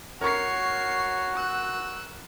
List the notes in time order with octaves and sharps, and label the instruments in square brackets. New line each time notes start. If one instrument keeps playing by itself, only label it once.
[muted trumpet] F#4 [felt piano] A#4 C#6 [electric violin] C#5 C7
[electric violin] E6 F#6